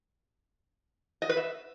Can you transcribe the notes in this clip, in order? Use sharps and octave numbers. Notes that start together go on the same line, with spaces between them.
D#5
B4
E5